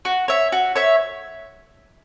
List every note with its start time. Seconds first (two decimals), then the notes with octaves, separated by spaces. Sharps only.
0.05 F#4
0.28 C#5 E5
0.52 F#4
0.76 C#5 E5